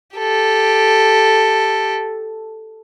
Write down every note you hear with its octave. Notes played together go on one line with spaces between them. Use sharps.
G4 A4